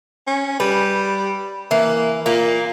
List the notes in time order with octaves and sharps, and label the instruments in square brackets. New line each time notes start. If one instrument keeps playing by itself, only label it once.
[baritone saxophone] C#4
[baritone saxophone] G3 [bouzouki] B4
[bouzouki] E3 [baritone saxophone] A#3
[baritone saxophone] A#2 [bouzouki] A#3